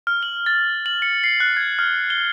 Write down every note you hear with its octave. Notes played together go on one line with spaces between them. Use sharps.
F6
F#7
A6
F#7
C#7
C7
F#6
G#6
F6
G7